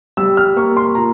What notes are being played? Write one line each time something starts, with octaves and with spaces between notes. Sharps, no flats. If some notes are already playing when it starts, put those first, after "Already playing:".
G3 E6
F6
A#3 C#6
C6
A#2 A#5